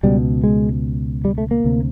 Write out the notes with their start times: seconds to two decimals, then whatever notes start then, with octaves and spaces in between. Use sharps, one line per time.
0.03 C#2 B2 G3
0.44 G#3
1.25 G3
1.38 A3
1.51 A#3
1.64 D2 C3